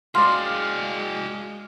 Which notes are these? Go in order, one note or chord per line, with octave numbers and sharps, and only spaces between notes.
G#3 F#4 G#4 D5 F5 C6